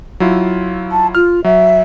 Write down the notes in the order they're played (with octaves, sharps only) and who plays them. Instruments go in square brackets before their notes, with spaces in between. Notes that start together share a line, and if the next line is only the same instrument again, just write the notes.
[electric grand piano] F#3 E4 F4
[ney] A5
[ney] F4 [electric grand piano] F6
[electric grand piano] F#3 [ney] E5